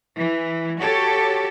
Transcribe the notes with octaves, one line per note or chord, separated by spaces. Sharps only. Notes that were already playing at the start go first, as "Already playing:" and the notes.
E3
F#4 G4 A4 C#5